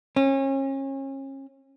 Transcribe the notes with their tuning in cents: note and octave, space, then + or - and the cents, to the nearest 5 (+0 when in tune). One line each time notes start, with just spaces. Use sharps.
C#4 -35